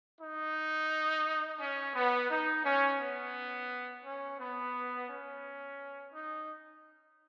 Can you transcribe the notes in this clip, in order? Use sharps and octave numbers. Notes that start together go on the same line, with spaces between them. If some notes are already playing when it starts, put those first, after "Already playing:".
D#4
C#4
B3
D#4
C#4
B3
C#4
B3
C#4
D#4